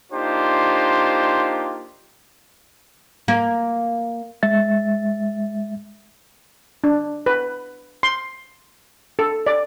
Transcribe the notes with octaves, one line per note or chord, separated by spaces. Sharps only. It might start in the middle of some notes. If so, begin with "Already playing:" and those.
A#3 D4 D#4 F4 G4 C5
A#3
G#3 E5 A6
D4
B4
C6
A4
D5